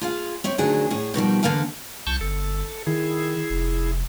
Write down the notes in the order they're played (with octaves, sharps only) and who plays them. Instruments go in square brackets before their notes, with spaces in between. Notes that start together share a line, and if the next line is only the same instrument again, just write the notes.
[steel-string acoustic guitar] F4 G#4 F5
C4 C#5 E5
D2 A#2 D#3 F#3 D4 G#4
A2 G#4
B2 D#3 F3 G3
E2 D3 F#3 A#3 F5 G#5
[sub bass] C2 [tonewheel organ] A5 C#6 G6
[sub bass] G1 [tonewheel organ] A4
[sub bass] D#3 [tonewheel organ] E4 G#4
[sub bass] F1